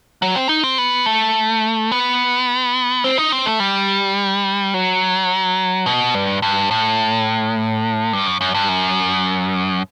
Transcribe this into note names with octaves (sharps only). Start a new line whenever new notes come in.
F#3
C4
D#4
C4
B3
A3
B3
C4
D#4
C4
A3
G3
F#3
B2
G2
G2
A2
G2
F#2
F#2
G2
F#2